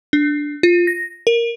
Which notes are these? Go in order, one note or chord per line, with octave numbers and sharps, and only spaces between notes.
D4
F4
A#6
A#4